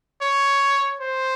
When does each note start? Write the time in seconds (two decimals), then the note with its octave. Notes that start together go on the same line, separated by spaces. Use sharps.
0.22 C#5
1.01 C5